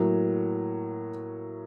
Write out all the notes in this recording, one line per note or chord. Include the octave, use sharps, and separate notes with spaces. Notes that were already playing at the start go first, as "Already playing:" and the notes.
Already playing: A2 F#3 A#3